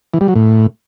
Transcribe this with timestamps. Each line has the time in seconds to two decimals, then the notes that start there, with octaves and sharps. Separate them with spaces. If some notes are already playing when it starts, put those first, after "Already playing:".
0.14 E3
0.21 G3
0.28 F#3
0.35 A2